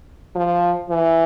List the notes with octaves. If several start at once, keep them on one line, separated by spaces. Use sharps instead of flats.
F3
E3